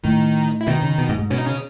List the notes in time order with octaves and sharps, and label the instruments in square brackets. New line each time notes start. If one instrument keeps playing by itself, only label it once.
[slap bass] A2 [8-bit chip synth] D#3 D#4
[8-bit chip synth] E4
[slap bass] B2 [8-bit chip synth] D#3 D#4
[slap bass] C#3
B2
G#2
G#2
[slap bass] B2 [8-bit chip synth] C#4
[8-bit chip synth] D#4
C#3 C#4